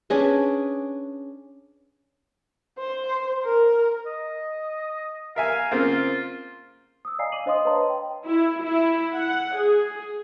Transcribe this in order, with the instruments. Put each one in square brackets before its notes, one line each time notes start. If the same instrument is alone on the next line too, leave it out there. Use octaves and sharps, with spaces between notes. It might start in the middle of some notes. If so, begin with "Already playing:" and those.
[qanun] C#4 D4 G#4 B4
[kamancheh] C5
A#4
[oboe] D#5
[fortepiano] A#4 E5 G#5 [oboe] F5
[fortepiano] C#3 A#3 C4 [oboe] F4
[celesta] D#6 E6
D5 D#5 F5 G#5 A#5 C7
D6 D#7 F#7
D4 C5 D#5 F5 C6 D#6
B4 C#5 D#5 A5 A#5 C6
G5 C6
[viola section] E4
E4
F#5
G#4